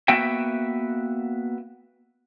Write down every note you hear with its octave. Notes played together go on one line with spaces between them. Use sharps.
A#3 B3 F#4 E5 G5